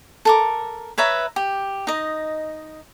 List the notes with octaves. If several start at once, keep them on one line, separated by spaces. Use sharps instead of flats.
A4 A#4 D6
B4 C#5 E5 A#5
G4
D#4 D#5